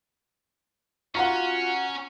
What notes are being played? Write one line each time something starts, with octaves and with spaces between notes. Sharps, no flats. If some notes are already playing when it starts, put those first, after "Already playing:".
C#4 F4 F#4 F5 F#5 A#5 C#6